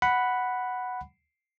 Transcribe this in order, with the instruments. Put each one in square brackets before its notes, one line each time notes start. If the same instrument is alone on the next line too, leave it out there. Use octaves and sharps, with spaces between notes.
[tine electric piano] F#5 B5